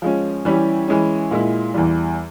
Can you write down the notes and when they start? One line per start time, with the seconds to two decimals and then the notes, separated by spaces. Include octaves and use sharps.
0.02 F3 G#3 C#4
0.45 E3 G3 C#4 E4 G4
0.88 E3 G#3 C#4
1.31 A#2 G#3 E4
1.74 E2 E3 G3